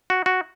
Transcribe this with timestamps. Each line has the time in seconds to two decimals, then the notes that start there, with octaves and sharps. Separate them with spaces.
0.10 F#4
0.26 F#4